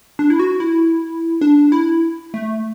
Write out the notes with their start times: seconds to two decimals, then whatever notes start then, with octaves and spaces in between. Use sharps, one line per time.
0.19 D4
0.30 E4
0.39 F#4
0.60 E4
1.41 D4
1.72 E4
2.34 A3